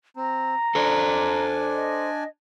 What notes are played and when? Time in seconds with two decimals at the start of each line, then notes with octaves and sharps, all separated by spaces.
0.16 C4 A#5
0.75 D4 A4 C5 D5 G#5
1.73 D#5